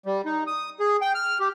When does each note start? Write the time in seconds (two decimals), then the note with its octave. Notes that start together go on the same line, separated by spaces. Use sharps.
0.06 G3
0.26 D#4
0.47 D#6
0.80 G#4
1.01 G5
1.15 F6
1.40 G4